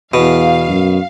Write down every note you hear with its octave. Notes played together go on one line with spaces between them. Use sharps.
E2 B2 F5
F#2